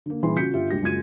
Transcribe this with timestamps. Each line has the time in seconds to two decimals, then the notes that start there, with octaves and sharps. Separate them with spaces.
0.06 D3 A#3
0.23 A#1 E3 G3 G#4 C6
0.36 C#3 F4 F#4 G6 B6 C#7
0.53 G1 F4 G4 E5
0.71 D2 G#3 G4 A#6
0.82 F#1 G#3 F4 F#4 G#6 D#7